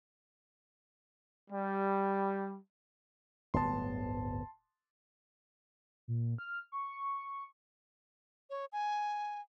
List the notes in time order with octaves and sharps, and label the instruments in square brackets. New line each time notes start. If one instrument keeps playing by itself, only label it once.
[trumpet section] G3
[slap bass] D1 G1 B3 [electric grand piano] A5 C6
[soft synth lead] A#2
F6
C#6
[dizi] C#5
G#5